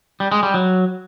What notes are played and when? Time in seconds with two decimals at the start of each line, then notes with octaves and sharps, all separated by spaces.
0.20 G3
0.32 G#3
0.43 G3
0.54 F#3